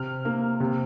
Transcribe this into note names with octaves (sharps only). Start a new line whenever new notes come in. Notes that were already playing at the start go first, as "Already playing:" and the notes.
Already playing: C3 F6
A#3
C3